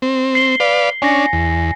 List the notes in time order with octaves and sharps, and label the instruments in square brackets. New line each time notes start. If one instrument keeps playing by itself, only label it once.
[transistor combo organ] C4
[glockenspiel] C7 F#7 G7
[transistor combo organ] B4 D5 F5
[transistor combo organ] C#4 D4 [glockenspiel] G#5 A#6 C#7
[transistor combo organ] E2